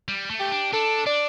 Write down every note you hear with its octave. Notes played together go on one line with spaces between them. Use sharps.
G3
A3
G4
D4
D4 A4
D4 D5